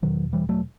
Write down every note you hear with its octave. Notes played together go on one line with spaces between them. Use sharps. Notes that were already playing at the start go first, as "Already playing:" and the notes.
E2 B2 D#3 F#3
E3 G3
F#3 A3